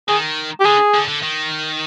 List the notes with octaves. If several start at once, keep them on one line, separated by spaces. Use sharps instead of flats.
D#3 G#4
G4
D3 G#4
D3
D3
D#3